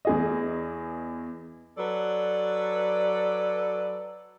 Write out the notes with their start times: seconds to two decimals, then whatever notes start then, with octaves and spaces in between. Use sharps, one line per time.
0.05 E2 G#4 D#5
1.78 F#3 A4 B4 D5